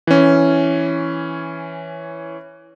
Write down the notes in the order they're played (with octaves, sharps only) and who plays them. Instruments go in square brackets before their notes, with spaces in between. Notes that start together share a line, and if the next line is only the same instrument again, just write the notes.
[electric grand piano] E3 C#4